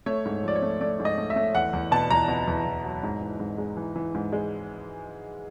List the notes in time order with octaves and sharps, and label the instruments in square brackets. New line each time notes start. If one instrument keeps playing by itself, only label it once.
[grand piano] A3 C#5
G#2
F3 D5
C#5
A3
A3 D5
G#2
D#5
A3
E5
A3
E2 F#5
E2
B2 A5
E2 A#5
B2
E2
E2
F#3
G#2
E3
G#2
G#3
E3
E3
G#2
G#3